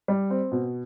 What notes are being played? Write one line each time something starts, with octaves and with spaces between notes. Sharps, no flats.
G3
C4
B2